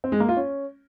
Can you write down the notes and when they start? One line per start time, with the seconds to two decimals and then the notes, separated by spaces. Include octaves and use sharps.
0.04 C4
0.12 G#3
0.20 A#3
0.29 F4
0.37 C#4